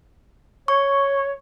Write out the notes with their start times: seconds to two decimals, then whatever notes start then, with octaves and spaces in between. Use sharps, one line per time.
0.68 C#5 C#6